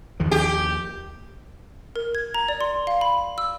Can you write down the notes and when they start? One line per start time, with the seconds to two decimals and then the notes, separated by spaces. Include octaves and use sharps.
0.20 D#2 D#3 F3
0.31 G4
1.96 A#4
2.15 G#6
2.34 A#5
2.48 D5
2.61 C6
2.87 F5
3.01 B5
3.38 E6